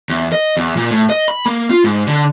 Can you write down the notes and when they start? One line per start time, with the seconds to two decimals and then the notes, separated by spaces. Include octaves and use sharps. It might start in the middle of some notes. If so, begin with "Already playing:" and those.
0.09 E2
0.32 D#5
0.57 E2
0.77 A#2
0.91 A2
1.10 D#5
1.28 B5
1.46 A#3
1.70 F4
1.84 G#2
2.07 D3